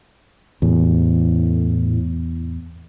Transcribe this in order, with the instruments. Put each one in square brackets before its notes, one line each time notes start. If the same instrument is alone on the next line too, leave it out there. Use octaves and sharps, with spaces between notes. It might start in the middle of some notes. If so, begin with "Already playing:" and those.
[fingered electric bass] E2 [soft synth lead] A2